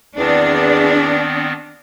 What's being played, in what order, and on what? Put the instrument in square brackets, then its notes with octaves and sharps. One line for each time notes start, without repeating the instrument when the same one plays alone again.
[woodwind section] E2 [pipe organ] D#3 B3 C4 [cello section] D4